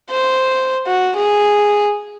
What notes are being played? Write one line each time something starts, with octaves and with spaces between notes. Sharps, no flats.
C5
F#4
G#4